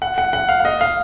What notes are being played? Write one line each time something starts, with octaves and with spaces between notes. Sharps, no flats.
F#5
F#5
F#5
F5
F5
D#5
F5